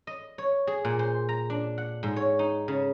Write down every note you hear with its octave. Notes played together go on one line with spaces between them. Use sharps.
D#5
C#5
G#4
A#2
C5
A#5
D4
F#5
G#2
C#5
D#4
C#3